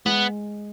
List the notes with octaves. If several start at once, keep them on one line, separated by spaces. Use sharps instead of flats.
G#3 B3